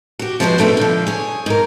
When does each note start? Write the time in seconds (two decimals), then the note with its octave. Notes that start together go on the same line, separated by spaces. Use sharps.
0.19 F#4 G4
0.40 F3 G#3 B3 F#4 G#4 C5
0.58 G2 B2 D#3 A3 C4 F4
0.77 D3 F3
1.07 G#4 C#5
1.46 G#2 A#4